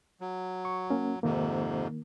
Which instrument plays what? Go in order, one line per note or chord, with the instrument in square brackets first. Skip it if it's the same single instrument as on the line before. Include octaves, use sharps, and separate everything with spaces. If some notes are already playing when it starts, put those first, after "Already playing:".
[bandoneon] F#3
[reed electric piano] C#6
A#3 C#4
[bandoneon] F2 G#2 C3 [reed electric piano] D#3 A#3